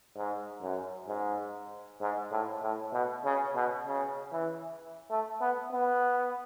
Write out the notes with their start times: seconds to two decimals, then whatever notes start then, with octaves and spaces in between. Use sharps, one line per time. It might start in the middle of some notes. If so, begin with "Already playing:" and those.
0.16 G#2
0.62 F#2
1.08 G#2
2.01 G#2
2.32 A2
2.63 A2
2.94 B2
3.25 C#3
3.56 B2
3.87 C#3
4.33 E3
5.10 A3
5.41 B3
5.73 B3